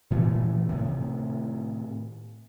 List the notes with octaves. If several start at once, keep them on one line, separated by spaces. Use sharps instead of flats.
A#2 E3 F3 A3
A2 C3 D#3